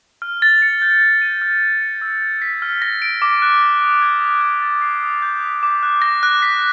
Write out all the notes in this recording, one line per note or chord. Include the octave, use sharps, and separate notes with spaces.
F6
A6
C#7
G6
A#6
D#7
F6
G#6
C#7
E6
G#6
B6
F6
A#6
D7
D6
F#6
A#6
D#6
G#6
B6
F#6
A6
C7
D#6
G6
B6
D6
F#6
A#6
F#6
B6